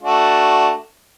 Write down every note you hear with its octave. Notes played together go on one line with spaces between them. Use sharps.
A3 D4 F#4